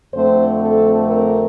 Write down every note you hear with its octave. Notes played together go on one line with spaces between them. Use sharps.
F2 D3 A3 C4 C5
A4
A#4